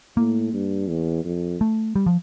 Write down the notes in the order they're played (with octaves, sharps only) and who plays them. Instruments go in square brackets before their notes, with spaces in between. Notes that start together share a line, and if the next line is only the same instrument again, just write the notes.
[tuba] A2 [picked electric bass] A#3
[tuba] G2
E2
F2
[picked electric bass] A3
G3
F3